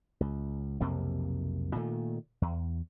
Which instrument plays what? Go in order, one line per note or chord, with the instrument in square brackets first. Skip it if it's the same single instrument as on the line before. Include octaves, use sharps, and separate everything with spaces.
[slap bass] C#2
B1 F2 C3 A#3
A#2 D#3 A3
E2